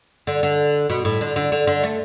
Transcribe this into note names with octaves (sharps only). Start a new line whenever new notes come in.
D3
D3
B2
A2
D3
D3
D3
D3
A3